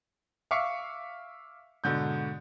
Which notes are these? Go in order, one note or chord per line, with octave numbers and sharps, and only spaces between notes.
E5 F5 C#6 D6 C7 C#7
G#2 B2 D3 G6